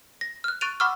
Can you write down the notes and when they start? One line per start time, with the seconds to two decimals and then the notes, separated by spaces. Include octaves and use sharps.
0.21 A#6
0.44 F6 F#6
0.61 C#6 F#6 A6 D7 D#7 F7
0.80 F#5 B5 C#6 D6 E6 F6